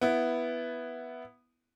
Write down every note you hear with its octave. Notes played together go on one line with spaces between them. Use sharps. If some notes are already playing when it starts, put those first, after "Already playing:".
B3 E4